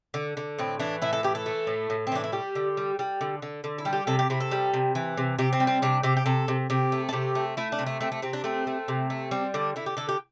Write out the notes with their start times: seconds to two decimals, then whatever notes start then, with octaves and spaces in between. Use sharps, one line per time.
0.14 D3
0.37 D3
0.59 A2 C4
0.80 E3 D4
1.02 A2 E4
1.13 A4
1.23 E3 G4
1.35 A4
1.46 A3
1.67 A2
1.90 A2
2.07 C4
2.12 E3 D4
2.24 E4
2.32 G3 G4
2.55 D3
2.77 G3
2.99 G3
3.21 D3
3.42 D3
3.64 D3
3.78 E4
3.85 G3
3.93 G4
4.07 C3 A4
4.19 G4
4.30 C3 E4
4.40 A4
4.51 G3
4.74 C3
4.95 E3
5.17 C3
5.39 C3 G4
5.53 C4
5.60 G3
5.67 C4
5.82 C3 D4
6.03 C3 G4
6.17 G4
6.26 C3 A4
6.48 C3
6.70 C3 G4
6.92 A3
7.09 A4
7.13 C3 G4
7.35 A3
7.57 A3 E4
7.72 D4
7.79 C3
7.87 A3
8.01 A3 C4
8.12 A3
8.22 C3 C4
8.33 D4
8.44 A3 C4
8.67 A3
8.88 C3
9.10 A3
9.31 G3 C4
9.54 D3 D4
9.76 D3 E4
9.86 G4
9.97 D3 A4
10.09 G4